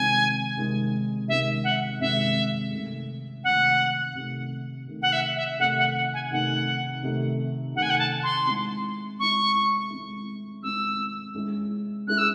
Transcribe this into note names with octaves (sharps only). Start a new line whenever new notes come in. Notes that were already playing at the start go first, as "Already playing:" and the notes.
Already playing: C3 D#3 G#3 C4 G#5
C3 D#3 G#3 C4
C3 D#3 G#3 C4 E5
F#5
C3 D#3 G#3 C4 E5
C3 D#3 A3
C3 D#3 A3 F#5
C3 D#3 A3
C3 D#3 A3
F#5
E5
E5
C3 D#3 A3 D#4 F#5
F#5
F#5
G#5
C3 D#3 A3 D#4 F#5
C3 D#3 A3 D#4
C3 D#3 A3 D#4 F#5
G#5
F#5
A5
C6
G#3 C4 E4
G#3 C4 E4 C#6
G#3 C4 E4
G#3 C4 E4 E6
G#3 C#4 E4 G#4
G#3 C#4 E4 G#4 F#6
E6